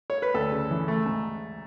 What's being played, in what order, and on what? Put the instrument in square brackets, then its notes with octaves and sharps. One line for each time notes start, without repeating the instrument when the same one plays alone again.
[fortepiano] C#5
B4
D2 A4
C#3
E3
A3
G#2